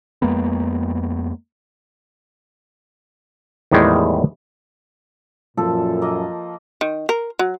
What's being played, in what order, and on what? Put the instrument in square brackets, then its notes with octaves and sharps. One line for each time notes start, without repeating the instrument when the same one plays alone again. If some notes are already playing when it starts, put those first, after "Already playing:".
[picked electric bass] F2 G#3 A#3 B3
[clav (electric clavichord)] E2 A2 D#3 G3 G#3
[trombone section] F#2 A#2 [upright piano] F3 [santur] A4
[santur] A#3 D#5
[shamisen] D#3
A#4
F#3